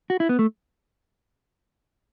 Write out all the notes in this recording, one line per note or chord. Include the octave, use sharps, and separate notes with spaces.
F#4
E4
B3
A3